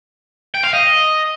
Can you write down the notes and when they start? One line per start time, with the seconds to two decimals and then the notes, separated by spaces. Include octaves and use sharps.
0.55 G5
0.64 F5
0.74 D#5